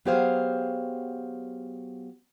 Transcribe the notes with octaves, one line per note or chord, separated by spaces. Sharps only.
F#3 B3 G4 G#4 C5 F5